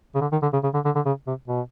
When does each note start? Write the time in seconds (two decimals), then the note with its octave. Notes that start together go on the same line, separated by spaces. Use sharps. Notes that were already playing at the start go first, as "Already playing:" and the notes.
0.15 C#3
0.21 D3
0.32 D#3
0.42 D3
0.53 C#3
0.63 C#3
0.74 D3
0.85 D3
0.95 D3
1.05 C#3
1.27 C3
1.48 B2